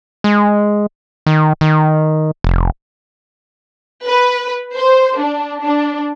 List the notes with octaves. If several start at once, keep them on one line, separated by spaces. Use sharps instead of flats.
G#3
D#3
D#3
F1
B4
C5
D4
D4